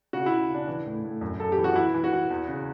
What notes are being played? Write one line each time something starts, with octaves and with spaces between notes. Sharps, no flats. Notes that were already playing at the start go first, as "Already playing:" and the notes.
C#3 F#4
C#3 E4
C#3 D4
E3
A2
A2
F#2
F#2 A4
G4
E3
F#4
E3 E4
E3
F#4
E3
E2
C#3